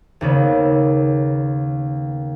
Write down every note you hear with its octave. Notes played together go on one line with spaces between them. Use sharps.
D#2 C#3 B3